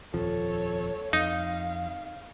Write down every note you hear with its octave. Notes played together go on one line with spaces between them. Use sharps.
D#1 F2 F3 A4 C#5
F2 D#4 F5